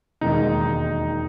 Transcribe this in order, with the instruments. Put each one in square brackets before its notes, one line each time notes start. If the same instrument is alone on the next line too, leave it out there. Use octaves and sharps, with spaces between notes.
[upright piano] E1 D#2 D#3 G#3 [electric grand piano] D#4